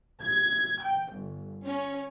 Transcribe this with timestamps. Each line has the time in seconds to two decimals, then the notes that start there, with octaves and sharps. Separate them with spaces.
0.21 G#6
0.82 G5
1.14 G1
1.64 C#4